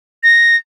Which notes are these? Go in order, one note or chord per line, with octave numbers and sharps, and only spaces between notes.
A#6